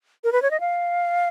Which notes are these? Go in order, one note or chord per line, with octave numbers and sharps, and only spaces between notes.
A#4
B4
C#5
D#5
F5